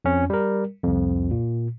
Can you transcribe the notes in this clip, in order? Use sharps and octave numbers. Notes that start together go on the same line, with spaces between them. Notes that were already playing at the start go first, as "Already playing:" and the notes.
F2 C#4
G3 A#4
C2 F2
A#2